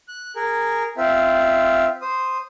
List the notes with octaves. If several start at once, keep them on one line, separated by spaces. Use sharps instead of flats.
F#6
G#4 A#4
C4 F4 E5
C5 D#6